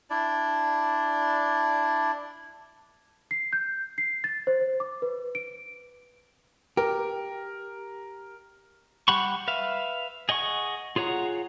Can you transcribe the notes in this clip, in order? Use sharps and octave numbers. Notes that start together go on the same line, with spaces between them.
D4 E4 D5
C7
G6
C7
A6
C5
C5
D6
B4
D7
G4 A#4
G3 G4 F#5 B5 C#6
B4 E5 F5
G#4 D#5 F#5 C#6
F4 G#4 C#5 F#5 A#5